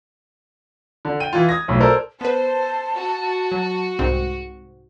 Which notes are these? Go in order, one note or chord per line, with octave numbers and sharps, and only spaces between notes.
D3
G5 D#7
E3 F4
D#6 G#6 A#6
B1 A2
A4 A#4 C5 D5
B3 B4 C5 A5
F#4
F#3
C2 G#2 C4